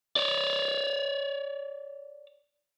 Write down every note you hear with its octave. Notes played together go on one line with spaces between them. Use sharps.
C#5 D5